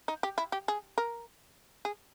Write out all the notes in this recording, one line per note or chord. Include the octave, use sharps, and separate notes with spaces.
D#4
G4
E4
G4
G#4
A#4
G#4